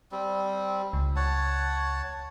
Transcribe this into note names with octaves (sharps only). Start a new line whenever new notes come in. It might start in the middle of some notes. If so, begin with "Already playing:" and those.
G3 C4
C#2
C#5 F#5 A5